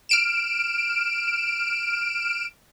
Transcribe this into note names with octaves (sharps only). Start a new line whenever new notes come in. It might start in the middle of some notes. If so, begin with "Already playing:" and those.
F6 D7 E7